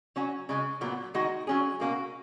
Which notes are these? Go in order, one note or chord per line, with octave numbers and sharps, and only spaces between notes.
F#3 C#4 F#4
C#3 G#3 C#4
A#2 F#3 B3
D#3 G#3 D#4 F#4
F#3 C#4 G#4
B2 A#3 C#4 F#4